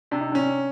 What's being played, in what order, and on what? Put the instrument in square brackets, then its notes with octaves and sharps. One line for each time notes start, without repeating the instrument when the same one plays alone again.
[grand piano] C3 [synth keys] D4
[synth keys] D#4
[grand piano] C#4 [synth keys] D4